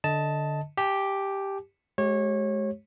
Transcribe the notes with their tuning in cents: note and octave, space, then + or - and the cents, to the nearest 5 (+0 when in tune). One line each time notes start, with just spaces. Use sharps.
D3 +0 D#5 +20 A5 +0
G4 +0 G#5 +45
G#3 +30 G4 -25 C#5 -25